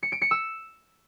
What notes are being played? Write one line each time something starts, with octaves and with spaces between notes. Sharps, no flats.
C#7
D7
C#7
E6